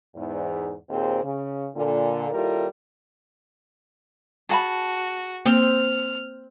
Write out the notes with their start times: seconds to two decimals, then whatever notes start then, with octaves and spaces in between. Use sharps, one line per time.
0.15 E2 G#2
0.90 D#2 A#2 C4 G#4 C5
1.23 C#3
1.75 A#2 D3
2.31 D#2 G3 E4 F4 A4 A#4
4.49 F#4 G#4 A5 B5
5.46 A#3 C4 F6